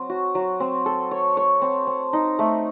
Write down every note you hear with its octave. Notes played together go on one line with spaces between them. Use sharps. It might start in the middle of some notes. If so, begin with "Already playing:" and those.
Already playing: F#3 C4
F#4
F#3
C4
A4
C#5
C#5
C4
C4
D#4
A3